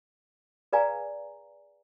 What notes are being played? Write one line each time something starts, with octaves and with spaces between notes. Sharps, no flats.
G#4 B4 D5 F5 G#5 A#5